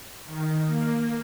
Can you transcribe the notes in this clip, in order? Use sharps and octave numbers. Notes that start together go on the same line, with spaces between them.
D#3
A#3